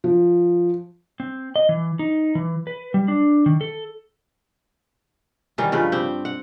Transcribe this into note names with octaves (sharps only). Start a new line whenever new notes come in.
F3
C4
D#5
E3
D#4
E3
B4
G3
D4
D#3
A4
D#3 E3 G3 C#4
G2 C#3 F3 B4
C4 G4
F#5